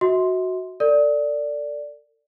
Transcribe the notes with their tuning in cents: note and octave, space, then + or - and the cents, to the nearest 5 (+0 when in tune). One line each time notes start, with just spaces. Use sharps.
F#4 +0 E5 -45 C6 +0
A4 +40 D5 -5